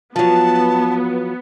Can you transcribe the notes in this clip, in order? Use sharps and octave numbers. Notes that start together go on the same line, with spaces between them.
F3 F#3 B3 A5